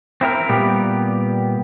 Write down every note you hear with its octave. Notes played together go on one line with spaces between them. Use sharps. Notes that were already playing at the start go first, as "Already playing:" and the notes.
C4 E4 A4 A#4
A#2 G3 B3 G4